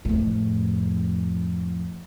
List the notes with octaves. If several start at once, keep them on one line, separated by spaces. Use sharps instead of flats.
F2 A2